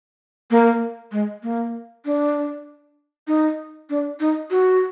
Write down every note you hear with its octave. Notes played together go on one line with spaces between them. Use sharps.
A#3
G#3
A#3
D4
D#4
D4
D#4
F#4